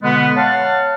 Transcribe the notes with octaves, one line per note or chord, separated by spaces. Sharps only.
B2 D3 G#3 B3
C#5 F5 F#5 A5